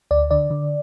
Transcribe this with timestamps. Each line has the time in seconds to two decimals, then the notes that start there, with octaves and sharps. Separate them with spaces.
0.11 D2 D5
0.31 D3 D5
0.50 D3